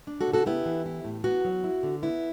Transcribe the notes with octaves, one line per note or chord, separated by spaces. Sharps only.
D4
F#4 A4
C#3
F#4 A4
B3 E4 G4
E3
E4
A2
B3 F#4
F#3
E4
D3
B3 E4